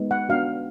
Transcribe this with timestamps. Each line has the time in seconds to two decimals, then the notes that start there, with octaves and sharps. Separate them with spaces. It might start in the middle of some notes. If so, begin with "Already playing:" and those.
Already playing: G#3 B3 D#4
0.11 F#5
0.29 B3 D4 F#4 F5